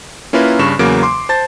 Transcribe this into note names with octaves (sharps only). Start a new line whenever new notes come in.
A#3 C#4 E4 F4 A#4 B4
G2 C#3 C#6 E7
E2 C#3 F#3 A#3 D6 D7
C6 D6
C5 A5 A6